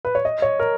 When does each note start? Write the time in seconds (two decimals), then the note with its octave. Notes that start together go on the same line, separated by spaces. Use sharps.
0.05 B4
0.15 C#5
0.25 D#5
0.42 C#5
0.59 A#4